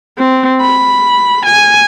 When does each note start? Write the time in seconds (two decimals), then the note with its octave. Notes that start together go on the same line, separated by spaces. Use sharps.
0.19 C4
0.61 B5
1.46 G#5